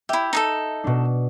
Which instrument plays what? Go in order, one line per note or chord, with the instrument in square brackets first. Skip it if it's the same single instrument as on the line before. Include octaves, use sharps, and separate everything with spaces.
[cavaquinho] E4 G4 [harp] E5
[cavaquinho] D#4 G#4 A4
[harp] B2 D4